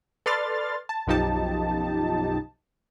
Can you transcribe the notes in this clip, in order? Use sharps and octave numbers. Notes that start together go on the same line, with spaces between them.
A4 B4 D5 C6 F6 A6
A5
B1 F#2 F3 D#4 G4 A5